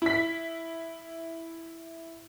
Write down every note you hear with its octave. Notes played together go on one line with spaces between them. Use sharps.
E4 B6